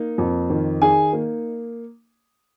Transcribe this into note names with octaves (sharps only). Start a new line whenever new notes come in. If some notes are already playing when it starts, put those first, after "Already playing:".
Already playing: A#3 D#4
F2
D#3
D#4 G#4 G#5
A#3